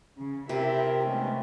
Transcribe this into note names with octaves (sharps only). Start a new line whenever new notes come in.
C#3
C3 E4 F4 G4 A#4 E5
B2 D#3 G#3 A3 B3 C#4